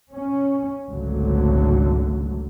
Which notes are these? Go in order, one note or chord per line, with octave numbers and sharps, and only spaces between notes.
C#4
G#1 C#2 A#2 D3 F#3 A3